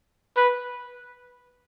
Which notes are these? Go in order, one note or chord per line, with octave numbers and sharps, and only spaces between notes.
B4